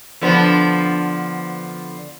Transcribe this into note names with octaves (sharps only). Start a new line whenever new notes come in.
D3 F3 B3